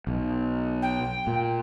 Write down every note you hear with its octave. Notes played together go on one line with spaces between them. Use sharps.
B1
G5
A#2